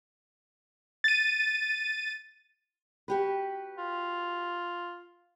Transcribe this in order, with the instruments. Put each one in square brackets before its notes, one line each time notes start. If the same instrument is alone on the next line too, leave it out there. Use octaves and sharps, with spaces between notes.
[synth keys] A6 D#7
[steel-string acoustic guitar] F#4 G4 B4
[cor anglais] F4